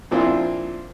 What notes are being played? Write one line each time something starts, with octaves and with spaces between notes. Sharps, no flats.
A#2 F3 C4 D4 E4 F4